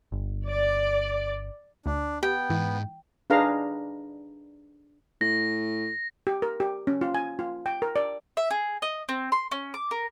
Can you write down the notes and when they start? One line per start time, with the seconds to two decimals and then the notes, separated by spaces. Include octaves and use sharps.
0.12 G1
0.48 D5
1.86 D2 D4
2.23 B3 G4 G5
2.50 G#2 E3
3.30 D4 D#4 G#4 B4 F5 A#5
5.21 A2 A#6
6.27 G4
6.42 A#4
6.60 G4
6.87 C#4
7.01 F4
7.15 G#5
7.39 F4
7.66 G5
7.82 A#4
7.96 D5
8.37 E5
8.51 G#4
8.82 D#5
9.09 C4
9.32 C6
9.51 C#4
9.74 D6
9.91 A#4